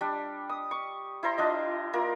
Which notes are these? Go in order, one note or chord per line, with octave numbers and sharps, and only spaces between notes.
G3 D4
D#6
C#6
E4 C5 A#5 C6
D4 E4 D#5
A#3 F4 A#4